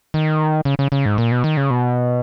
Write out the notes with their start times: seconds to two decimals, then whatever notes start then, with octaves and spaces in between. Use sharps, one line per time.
0.14 D#3
0.65 C#3
0.79 C#3
0.92 C#3
1.06 G#2
1.18 A#2
1.31 B2
1.44 D#3
1.57 C#3
1.70 B2